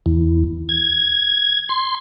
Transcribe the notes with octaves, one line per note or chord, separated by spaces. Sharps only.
E2
G#6
C6